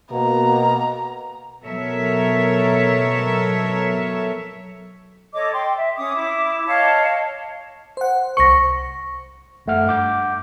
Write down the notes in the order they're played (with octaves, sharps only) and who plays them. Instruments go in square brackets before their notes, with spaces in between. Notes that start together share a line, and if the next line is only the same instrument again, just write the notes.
[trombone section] B2 A#3 [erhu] A#5
[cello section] B2 F#3 A4 A#4 C#5 E5
[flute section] A4 C#5 D#5 D6
G5 C6
E5
C#4 D6 D#6
E4 D6
C#5 D#5 F5 A5
[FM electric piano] C5 F#5
[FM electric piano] C2 C5 C#7 [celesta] C#6 A#6
[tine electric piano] G1 F#2 A3 F#5 F6
G2 F#5 D6 G6